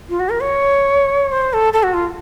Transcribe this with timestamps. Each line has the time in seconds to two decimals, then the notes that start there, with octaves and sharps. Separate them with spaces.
0.10 F4
0.20 F#4
0.29 A#4
0.40 C#5
1.32 C5
1.53 A4
1.73 A4
1.83 F#4
1.94 F4